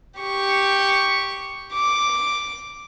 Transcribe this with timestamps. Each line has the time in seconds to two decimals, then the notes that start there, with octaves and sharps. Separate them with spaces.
0.20 G4 C#6
1.74 D6